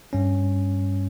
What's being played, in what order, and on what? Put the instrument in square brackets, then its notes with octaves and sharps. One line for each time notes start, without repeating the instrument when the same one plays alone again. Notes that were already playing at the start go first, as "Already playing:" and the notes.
[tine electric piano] G2 G3 C#4